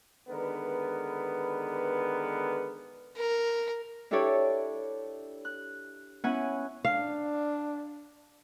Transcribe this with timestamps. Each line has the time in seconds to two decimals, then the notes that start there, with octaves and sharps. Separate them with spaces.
0.29 D3 D#3 G#3 B3 A#4 B4
3.17 A#4
4.11 D4 E4 G4 A4 C#5 D5
5.45 F#6
6.24 B3 C#4 E4 F#5 G#5
6.85 D4 F5